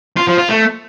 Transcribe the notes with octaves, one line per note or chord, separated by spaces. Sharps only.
F4
F3
F4
A3